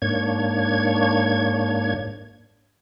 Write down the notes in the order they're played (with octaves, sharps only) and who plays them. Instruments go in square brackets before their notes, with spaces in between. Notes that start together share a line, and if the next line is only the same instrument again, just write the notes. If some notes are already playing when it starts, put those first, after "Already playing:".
[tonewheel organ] G#2 A#3 D4 C#5 G#6